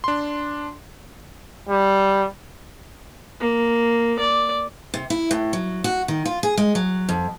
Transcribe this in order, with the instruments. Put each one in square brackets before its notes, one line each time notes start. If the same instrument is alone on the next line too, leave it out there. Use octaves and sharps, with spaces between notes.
[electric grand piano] D4 C6
[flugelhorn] G3
[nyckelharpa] A#3
D5
[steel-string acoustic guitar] C3
E4
A2
F#3
F#4
D#3
F4
G#4
G#3
F#3
F2